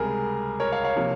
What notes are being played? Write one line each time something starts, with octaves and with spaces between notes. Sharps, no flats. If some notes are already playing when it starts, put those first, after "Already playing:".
Already playing: C#2 C3 G3 G#4 A#4
A#4 C#5
C#5 F5
C#5 F5
C3 F3 A#3